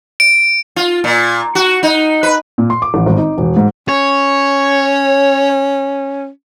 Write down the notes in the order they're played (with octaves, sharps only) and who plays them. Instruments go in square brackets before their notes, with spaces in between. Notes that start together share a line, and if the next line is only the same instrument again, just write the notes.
[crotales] D7
[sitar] F4
A#2
F#4
D#4
B4
[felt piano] A#2
C6
D6
A1
G#1
D#4
E1
G#2
[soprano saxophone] C#4 [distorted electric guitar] C#5